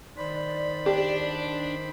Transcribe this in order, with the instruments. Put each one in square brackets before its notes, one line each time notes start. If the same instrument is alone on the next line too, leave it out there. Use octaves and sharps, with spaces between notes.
[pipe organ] D#3 C5 B5 [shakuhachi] D5
[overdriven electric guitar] D4 [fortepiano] G4